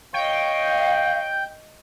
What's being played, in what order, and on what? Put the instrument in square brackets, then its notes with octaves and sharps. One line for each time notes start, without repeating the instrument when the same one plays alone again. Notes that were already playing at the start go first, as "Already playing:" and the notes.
[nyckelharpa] C#5 D#5 [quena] F5 [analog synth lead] G5